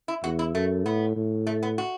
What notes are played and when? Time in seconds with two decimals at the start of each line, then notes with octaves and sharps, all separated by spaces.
0.08 E4
0.24 E2 F#4
0.39 E4
0.54 F#2 A3
0.85 A2 B3
1.16 A2
1.47 A3
1.63 B3
1.78 F#4